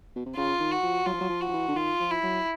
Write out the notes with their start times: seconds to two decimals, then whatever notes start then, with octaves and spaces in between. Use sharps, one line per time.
0.16 B2
0.26 C3
0.36 C#3 F4
0.59 D#3
0.71 F#4
0.83 F3
1.06 F#3 F4
1.13 F3
1.21 F#3
1.29 F3
1.41 F#4
1.49 F3
1.53 E3
1.68 D3
1.76 D#3 F4
2.00 F3
2.11 E4
2.23 F#3